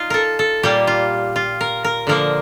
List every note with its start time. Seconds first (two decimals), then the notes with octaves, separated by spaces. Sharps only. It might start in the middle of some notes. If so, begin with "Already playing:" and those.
Already playing: D#4 F4
0.10 A4 A#4
0.39 A4
0.63 A#2 G3 A#3 G4
0.87 F4
1.36 F4
1.61 A#4
1.84 A#4
2.07 D3 F3 A#3 A#4